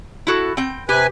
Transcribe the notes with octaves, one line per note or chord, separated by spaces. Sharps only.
E4 F#4 A4
C4 G5
C3 G4 B4 G#5